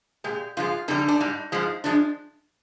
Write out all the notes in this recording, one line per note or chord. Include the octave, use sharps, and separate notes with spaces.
A#2 G#3 G4
G#2 F3 G#3 F4
F2 D3 G3 D#4
D4
G#2 G3 D#4
G#2 F3 G#3
F3 G#3 D4